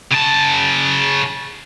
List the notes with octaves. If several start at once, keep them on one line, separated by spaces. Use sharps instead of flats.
C#3 A5